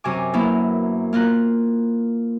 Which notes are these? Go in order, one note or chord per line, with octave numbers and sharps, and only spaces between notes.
F#2 C3 G#5 D6
F#3 A#3 B3 E4
A#3 F4 A#4 F#6